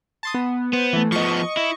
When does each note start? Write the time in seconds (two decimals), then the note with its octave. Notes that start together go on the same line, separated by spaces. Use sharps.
0.23 A5 C6 D#6
0.34 B3
0.73 B3 C5
0.93 E3 A3
1.12 F3 B3 D#5 C#6
1.57 E4